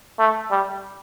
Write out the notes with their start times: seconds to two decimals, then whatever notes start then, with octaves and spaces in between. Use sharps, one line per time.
0.19 A3
0.51 G3